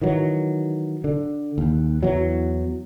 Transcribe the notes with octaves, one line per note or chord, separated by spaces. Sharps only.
D#3 E3 F#3
D3
D#2
E2 E3 F#3